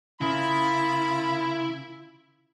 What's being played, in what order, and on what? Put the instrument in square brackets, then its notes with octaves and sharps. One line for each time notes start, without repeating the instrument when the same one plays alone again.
[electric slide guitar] C#3 [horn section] A#3 F4 B5 [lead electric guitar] E4